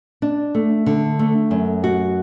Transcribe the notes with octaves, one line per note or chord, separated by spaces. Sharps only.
D4
A3
D3
A3
F#2
F#4